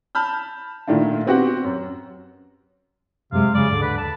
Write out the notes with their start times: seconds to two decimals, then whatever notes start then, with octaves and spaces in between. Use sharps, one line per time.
0.15 A5 B5 F6 G6
0.88 A#2 D#3 A3 D4 E4
1.27 B3 C4 F#4 G4 F#5
1.64 F#2
3.32 F#2 C3 G#3 F5
3.55 C#3 D5
3.71 D#2 G#2 D3
3.82 B4
3.98 A5